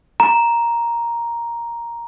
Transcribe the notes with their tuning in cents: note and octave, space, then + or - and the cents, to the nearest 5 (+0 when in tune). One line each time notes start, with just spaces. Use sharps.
A#5 +5